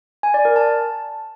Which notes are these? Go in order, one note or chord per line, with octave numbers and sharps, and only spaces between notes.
G#5
D5
A#4
A5